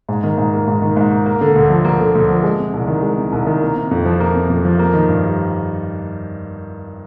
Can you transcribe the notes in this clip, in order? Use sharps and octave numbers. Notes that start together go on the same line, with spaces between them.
G#2
D#3
G#2
A#3
G#2
D#3
G#2
A#3
A#3
D3
D2
F3
A#3
D3
D2
F3
G#3
C3
C2
D#3
G#3
C3
C2
D#3
A#3
C3
F2
F3
A#3
C3
F2
F3
A#3
D#3
G2
G3